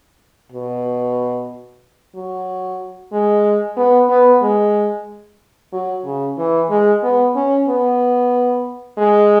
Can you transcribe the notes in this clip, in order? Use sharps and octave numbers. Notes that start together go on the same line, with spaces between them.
B2
F#3
G#3
B3
B3
G#3
F#3
C#3
E3
G#3
B3
C#4
B3
G#3